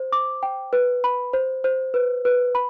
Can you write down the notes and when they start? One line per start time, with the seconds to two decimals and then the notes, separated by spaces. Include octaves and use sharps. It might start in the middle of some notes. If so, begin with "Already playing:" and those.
Already playing: C5
0.12 D6
0.43 G5
0.73 B4
1.04 B5
1.33 C5
1.64 C5
1.94 B4
2.25 B4
2.55 B5